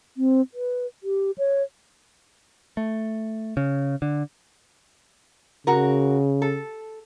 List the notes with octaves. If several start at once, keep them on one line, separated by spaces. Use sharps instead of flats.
C4
B4
G4
C#5
A3
C#3
D3
C#3 F#4 A#4
A4